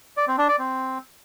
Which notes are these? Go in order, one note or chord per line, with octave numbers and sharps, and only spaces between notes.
D5
C4
D4
D5
C4